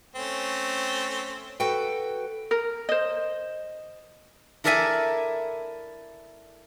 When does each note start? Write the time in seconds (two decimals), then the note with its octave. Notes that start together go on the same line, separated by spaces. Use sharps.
0.15 A3 C4 C#4
1.60 F#4 A4 B4 G5
2.51 A#4
2.89 C5 D#5
4.64 E4 A4 A#4 D5 E5 G#5